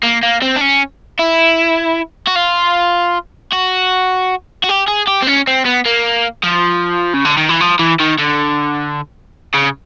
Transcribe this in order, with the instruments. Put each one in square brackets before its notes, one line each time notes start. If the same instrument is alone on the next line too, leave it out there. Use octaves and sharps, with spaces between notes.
[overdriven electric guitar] A#3
A#3
C4
D4
C#4
E4
F#4
F4
F#4
F#4
G4
G#4
G4
C4
C#4
C4
B3
A#3
F3
C#3
D3
D#3
E3
F3
E3
D#3
D3
C#3